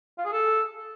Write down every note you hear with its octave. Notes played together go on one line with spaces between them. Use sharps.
F4
G#4
A4